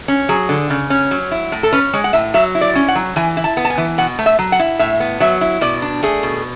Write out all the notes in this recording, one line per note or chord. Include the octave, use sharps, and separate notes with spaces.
C#4
F#3 G#4
D3
C#3
C#4
F#3
E4
A2
A4
C#4 B4
G#3 C#5
F#5
A2 E5
F#3 E5
E4
D5
C#4
F#5
F#3
E3 G#5
E4
A5
B3
A5
G#5
E3
B2 F#5
A3
E5
F#3
F#5
E4
A2 E5
B3
F#3 E5
E4
B2 D5
D4
A3 G#4
B2